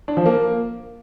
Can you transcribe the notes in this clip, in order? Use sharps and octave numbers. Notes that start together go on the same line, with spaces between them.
D4
F3
A#3